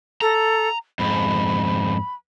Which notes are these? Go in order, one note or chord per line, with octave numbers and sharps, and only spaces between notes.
A4 A#5
F2 G#2 B5